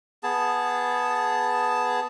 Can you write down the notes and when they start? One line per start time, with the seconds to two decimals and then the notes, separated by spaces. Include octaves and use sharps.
0.23 B3 G#4 A5